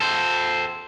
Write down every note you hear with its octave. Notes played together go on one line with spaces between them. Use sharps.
A4 C5